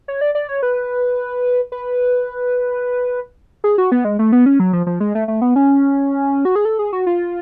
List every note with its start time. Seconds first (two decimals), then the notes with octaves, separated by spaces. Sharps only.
0.08 C#5
0.21 D5
0.35 D5
0.49 C#5
0.63 B4
1.72 B4
3.64 G#4
3.78 F#4
3.92 B3
4.05 G#3
4.19 A3
4.32 B3
4.46 C#4
4.60 F#3
4.73 F3
4.86 F3
5.00 G#3
5.15 A3
5.28 A3
5.41 B3
5.56 C#4
6.45 F#4
6.56 G#4
6.65 A4
6.79 G#4
6.93 F#4
7.06 F4